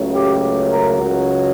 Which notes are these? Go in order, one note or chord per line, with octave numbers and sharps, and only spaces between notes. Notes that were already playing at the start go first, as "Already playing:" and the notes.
Already playing: C#2 C#3 F#3 A3
G4
A#4
C#2 C#3 F#3 F#4